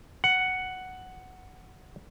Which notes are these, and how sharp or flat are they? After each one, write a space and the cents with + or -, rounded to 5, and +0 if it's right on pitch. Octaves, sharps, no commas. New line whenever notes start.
F#5 +5